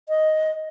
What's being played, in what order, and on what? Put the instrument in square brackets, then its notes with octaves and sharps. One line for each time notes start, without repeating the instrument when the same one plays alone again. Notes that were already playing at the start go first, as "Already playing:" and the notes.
[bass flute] D#5